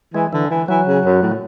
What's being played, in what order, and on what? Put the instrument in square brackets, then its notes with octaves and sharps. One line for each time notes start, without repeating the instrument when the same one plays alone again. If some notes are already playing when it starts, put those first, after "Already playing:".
[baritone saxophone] E3 [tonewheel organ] G#3
[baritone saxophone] D3 [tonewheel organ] E3
[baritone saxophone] E3
[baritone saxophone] E3 [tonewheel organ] F#3
[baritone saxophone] C#3
F#2
A2